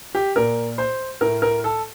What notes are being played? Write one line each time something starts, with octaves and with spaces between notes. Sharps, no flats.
G4
A#2 A#4
C5
A2 A#4
A#4
A4